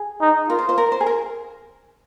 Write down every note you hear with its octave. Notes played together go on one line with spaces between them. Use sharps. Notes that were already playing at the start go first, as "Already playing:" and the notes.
Already playing: G#4
D#4
F4 A#4
C5
C5
A#4
C5
G#4
A#4